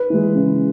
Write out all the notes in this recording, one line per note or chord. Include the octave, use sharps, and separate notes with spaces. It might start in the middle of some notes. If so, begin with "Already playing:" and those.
Already playing: B4
E3 G#3
C#3